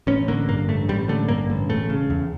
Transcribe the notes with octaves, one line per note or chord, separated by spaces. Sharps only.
A1 C#4
D3 A#3
G2 A#3
A1 A3
A1 G3
D3 A3
G2 A#3
A1
E1 A3
C#3
E2